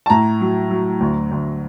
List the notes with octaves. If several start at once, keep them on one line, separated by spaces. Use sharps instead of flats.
A5
A2 A#5
F#3
F#3
D2
D2